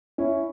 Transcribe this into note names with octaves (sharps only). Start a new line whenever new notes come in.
C#4 E4